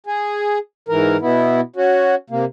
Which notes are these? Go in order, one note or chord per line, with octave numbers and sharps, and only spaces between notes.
G#4
G#2 E3 A#4
B2 B3 E4
C#4 F#4
C3 A#3